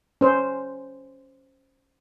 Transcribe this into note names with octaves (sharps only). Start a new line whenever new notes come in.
C#4 C5